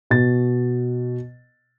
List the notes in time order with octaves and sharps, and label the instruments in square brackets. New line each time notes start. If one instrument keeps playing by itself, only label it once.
[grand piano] B2 A6